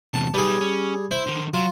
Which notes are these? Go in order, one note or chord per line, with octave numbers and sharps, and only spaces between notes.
E2 C3 A5
G3 B3 D#4 G#4
C#4
E4 C5
D3 D#3
F#3 F4